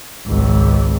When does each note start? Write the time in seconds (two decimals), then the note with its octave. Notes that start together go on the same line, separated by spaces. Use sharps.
0.25 G#1 C#2